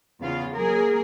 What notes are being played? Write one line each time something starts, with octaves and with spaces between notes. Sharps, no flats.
E2 C#3 B3 F4 F5
F#3 A#3 G#4 A#4